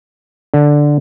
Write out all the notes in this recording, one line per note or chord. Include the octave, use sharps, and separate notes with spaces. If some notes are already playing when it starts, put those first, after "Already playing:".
D3